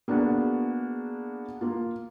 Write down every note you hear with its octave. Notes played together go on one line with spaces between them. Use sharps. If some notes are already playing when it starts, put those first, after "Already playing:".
A#3 B3 D4 F#4 G#4
A#3 F4